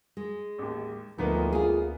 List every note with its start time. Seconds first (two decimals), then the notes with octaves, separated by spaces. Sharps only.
0.17 G#3
0.58 A1 D#2
1.18 D2 F3 A#3 B3 D#4
1.52 F4 G#4